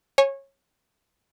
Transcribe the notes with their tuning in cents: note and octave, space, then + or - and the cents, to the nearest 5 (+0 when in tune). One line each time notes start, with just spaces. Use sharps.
C#5 -20 G#5 +0 C#6 +0